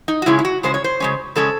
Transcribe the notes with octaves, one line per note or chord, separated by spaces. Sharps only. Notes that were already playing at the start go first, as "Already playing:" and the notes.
D#4
F#4
C#3 G#3 C#4 E4
E4
F#4
C#3 G#3 C#4 C5
C#5
C5
C#3 G#3 C#4
C#3 G#3 C#4 A4